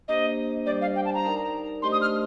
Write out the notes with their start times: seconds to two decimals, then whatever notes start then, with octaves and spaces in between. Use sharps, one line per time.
0.08 A#3 D4 G4 C5 D#5
0.66 G3 D4 G4 C5 D5
0.81 F5
0.96 G5
1.05 A5
1.14 A#5
1.25 D#4 A#4 D5
1.82 A3 D4 G4 C5 D#5 C6
1.92 D#6
2.01 F6